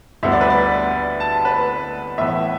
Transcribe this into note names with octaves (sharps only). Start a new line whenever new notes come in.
D2 D3 G3 B3 E5
D5
B4
D5
A5
B4
A2 E3 B3 E5